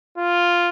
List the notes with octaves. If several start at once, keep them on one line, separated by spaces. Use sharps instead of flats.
F4